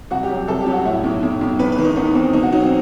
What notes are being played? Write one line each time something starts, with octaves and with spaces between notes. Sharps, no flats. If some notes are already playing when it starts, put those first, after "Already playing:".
C2 F#4
G4
F#3
G4
C2 A4
G4
F#3
F#4
A2 E4
B1
B1
B1
E2 B4
B4
D#3
D#4
E2 B3
E2 C4
B2 D#4
F#4
F#3 D#4
C4